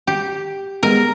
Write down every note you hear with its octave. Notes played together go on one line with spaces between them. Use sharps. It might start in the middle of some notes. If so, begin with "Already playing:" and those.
G4
G#3 B3 A#4